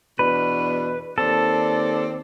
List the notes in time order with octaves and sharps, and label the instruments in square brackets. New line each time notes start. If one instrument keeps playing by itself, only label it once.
[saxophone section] E2 B2 D4 [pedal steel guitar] B4
[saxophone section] D#2 C4 D5 [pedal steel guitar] A4